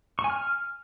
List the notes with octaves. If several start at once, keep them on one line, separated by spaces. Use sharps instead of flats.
C#6
G#5
F6